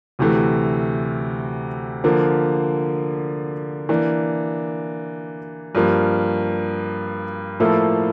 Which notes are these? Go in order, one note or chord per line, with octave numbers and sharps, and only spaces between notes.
D2 C3 E3 A3
D3 F3 A#3
E3 A#3 D4
G2 F3 A#3
A2 F3 A#3 E4 A4